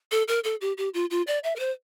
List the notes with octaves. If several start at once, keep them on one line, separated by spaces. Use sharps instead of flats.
A4
A#4
A4
G4
G4
F4
F4
D5
E5
A#4
C5